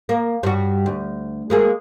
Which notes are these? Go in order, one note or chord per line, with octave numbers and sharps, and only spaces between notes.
A#3
G2 F#4
D2
G#3 A#3 G#4